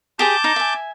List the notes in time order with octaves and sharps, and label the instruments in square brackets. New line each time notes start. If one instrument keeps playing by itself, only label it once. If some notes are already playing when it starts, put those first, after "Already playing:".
[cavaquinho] G4 G#4 C5 [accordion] A5 D6 G6
[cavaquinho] D#4
E5 G#5